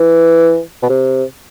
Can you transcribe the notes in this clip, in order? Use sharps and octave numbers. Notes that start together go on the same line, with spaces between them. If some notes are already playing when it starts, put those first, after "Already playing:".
Already playing: E3
B2
C3